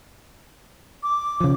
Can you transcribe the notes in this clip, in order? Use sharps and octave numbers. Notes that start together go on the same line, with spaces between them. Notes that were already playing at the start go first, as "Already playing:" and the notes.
D6
C#3 F3